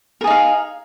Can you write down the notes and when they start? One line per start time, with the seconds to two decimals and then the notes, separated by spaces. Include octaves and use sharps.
0.21 A#4
0.24 G#4
0.27 D#4
0.30 F5